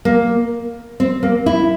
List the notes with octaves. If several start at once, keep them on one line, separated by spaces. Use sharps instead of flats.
A#3
C4
A#3
E4